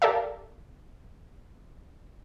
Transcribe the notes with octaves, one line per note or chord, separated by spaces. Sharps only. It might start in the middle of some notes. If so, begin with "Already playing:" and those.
G4 A4 A#4 D5 E5 F5